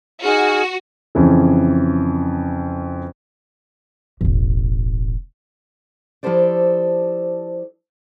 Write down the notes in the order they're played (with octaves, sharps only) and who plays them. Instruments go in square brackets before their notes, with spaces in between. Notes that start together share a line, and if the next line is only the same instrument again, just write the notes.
[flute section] D#4 G#4 F6 [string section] F#4
[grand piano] F2 C#3 E3
[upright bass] E1 A1
[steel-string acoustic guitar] F3 E4 G4 A4 C5 D5